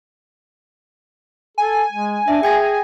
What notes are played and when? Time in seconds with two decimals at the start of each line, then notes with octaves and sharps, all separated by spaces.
1.58 A4 G#5
1.92 G#3
2.28 D4 E5
2.43 G#4 G5 G#6 A#6